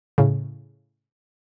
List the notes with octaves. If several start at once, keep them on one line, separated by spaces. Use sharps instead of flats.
A2 C#3